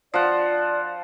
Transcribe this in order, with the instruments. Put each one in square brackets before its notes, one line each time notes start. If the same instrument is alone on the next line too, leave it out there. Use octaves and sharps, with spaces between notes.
[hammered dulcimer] F3 F#5 [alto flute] D5